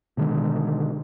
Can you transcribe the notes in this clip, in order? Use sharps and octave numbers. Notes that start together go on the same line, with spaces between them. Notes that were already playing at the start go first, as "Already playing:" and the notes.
B2 D3 D#3 G#3